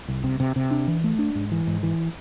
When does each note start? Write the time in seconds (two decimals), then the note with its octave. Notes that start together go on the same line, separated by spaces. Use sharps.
0.08 C2
0.24 C3
0.40 C3
0.56 C3
0.71 D4
0.87 E3
1.04 A3
1.19 D4
1.35 G#2
1.52 E3
1.67 G#2
1.83 E3